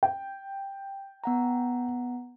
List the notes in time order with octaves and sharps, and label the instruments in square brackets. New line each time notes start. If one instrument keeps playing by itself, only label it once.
[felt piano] G5
[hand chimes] B3 F#5 A#5